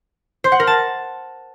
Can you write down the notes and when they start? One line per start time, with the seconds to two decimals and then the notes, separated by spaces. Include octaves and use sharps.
0.44 C5
0.52 F#5
0.60 A#4
0.67 A5